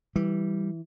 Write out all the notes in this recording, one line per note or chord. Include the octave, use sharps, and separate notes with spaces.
E3 G3